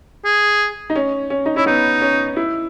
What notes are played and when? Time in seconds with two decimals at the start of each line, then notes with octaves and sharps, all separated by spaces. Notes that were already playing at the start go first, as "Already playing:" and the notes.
0.25 G#4
0.90 D#4
0.96 C#4
1.30 C#4
1.46 D#4
1.56 C#4 E4
1.66 B3 D#4
2.02 C#4
2.36 E4